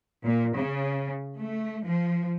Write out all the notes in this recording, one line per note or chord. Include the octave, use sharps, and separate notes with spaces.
A#2
C#3
A3
F3